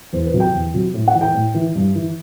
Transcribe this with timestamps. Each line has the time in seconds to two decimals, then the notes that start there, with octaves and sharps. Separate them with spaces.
0.13 E2 C5
0.27 B4
0.34 C3 F#3
0.40 G5
0.54 E2
0.74 C3 F#3
0.94 A2
1.08 F#5
1.15 E3
1.21 G5
1.34 A2
1.54 E3
1.75 G2
1.95 E3